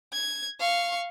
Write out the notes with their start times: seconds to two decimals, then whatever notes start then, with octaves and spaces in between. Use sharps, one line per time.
0.13 G#6
0.60 F5 C#6